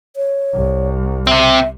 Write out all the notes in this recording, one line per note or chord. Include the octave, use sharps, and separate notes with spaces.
C#5
C2
C3 C4 E5